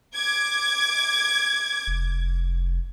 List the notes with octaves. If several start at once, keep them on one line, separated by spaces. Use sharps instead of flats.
D6 G#6
F1